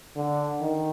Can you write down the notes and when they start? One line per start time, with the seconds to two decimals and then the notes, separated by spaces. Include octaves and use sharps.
0.16 D3
0.61 D#3